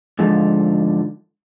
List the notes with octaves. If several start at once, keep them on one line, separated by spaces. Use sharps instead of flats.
G#2 D3 F3